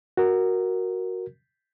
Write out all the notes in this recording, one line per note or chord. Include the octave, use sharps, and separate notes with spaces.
F#4 A#4